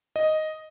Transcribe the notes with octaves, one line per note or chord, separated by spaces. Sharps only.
D#5